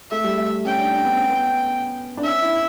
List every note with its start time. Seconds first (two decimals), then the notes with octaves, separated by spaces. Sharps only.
0.11 A3 E5
0.24 G3
0.38 A3
0.65 C#4 G5
0.78 D4
0.92 D4
1.04 B3
1.16 C#4
1.29 B3
2.17 D4
2.24 C#4 E5
2.42 E4